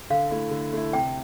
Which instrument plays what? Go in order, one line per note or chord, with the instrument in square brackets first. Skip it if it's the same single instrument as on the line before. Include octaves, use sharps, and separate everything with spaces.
[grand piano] D3 [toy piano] F5
[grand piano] A3 E4
D3
A3 E4
[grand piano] C3 [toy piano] G5